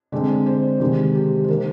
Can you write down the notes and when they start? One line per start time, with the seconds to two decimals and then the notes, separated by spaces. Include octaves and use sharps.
0.12 D3 G#3 C4 D5
0.46 C5
0.80 C3 D#3 G#3 G4
1.15 G4
1.44 C5
1.48 D#3 A#3 A#4